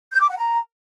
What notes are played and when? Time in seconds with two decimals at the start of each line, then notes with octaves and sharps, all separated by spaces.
0.12 G6
0.21 D6
0.29 F#5
0.38 A#5